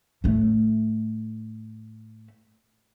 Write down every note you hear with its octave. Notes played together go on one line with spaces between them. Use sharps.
A2 A3